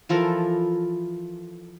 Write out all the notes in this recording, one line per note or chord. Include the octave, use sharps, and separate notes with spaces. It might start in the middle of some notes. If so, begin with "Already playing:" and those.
E3 F3 A4 A#4